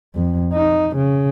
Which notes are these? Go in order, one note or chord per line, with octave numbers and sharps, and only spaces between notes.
F2
D#4
C#3